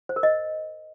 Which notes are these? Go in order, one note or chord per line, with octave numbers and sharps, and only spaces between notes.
C5
A#4
D#5